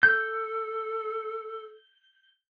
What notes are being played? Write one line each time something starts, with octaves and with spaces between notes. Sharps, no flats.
A4 G6